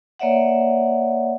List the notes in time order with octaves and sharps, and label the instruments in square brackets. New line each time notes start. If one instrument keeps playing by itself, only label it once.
[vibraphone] A#3 C#5 D5 E5 F#5